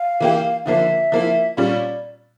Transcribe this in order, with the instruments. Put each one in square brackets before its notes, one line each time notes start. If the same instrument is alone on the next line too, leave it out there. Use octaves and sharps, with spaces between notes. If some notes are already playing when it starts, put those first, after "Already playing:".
Already playing: [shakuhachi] F5
[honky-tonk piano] E3 A#3 E4 G4
[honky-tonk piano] D3 F3 A#3 D4 [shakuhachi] E5
[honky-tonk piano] F3 A#3 E4
[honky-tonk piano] A#2 G3 C#4 [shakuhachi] D5